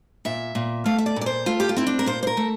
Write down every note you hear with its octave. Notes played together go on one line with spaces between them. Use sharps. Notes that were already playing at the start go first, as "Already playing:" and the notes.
A#2 E5
A#2
A3 F5
E5
D5
A#2
D5
C5
A3 F4
G4
F4
C4 E4
D4
A#4
A#2 C5
C5
A#4
A3